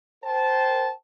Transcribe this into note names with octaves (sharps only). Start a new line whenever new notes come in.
A#4 C5 G5 A5